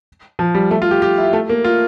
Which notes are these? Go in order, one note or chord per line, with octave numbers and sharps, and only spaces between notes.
F3
G3
A3
F4
G4
G4
E4
A3
A#3
F4